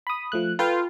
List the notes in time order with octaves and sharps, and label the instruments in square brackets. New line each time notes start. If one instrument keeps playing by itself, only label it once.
[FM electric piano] B5 D#6
F3 A3 F#6
[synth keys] F4 [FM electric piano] A4 B4 G5